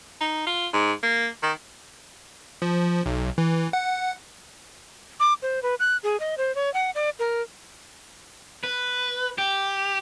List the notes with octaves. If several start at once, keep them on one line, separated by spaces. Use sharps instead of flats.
D#4
F4
G#2
A#3
D#3
F3
B1
E3
F#5
D6
C5
B4
F#6
G#4
D#5
C5
C#5
F#5
D5
A#4
B4
G4